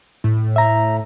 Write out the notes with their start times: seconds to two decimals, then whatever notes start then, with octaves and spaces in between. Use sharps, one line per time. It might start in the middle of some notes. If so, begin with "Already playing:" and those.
0.24 A2
0.56 E5 A#5